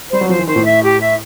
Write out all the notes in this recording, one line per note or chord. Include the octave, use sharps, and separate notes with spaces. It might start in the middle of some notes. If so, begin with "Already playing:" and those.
G3 C5
F#3
F3 C5
E3
D#3 C5
A2
E5
G4
E5